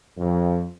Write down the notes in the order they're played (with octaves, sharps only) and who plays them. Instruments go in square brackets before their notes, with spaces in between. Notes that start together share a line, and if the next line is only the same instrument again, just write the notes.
[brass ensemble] F2